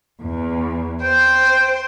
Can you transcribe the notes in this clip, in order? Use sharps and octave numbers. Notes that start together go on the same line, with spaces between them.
E2
C5 G5